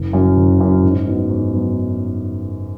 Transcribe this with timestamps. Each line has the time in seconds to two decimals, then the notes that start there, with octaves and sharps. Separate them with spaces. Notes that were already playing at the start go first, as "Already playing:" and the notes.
Already playing: F#1
0.13 F#2 F#3
0.37 F#1
0.60 F#2 F#3
0.83 G#2
1.06 F#3 B3 D#4
1.29 G#2
1.53 F#3 B3 D#4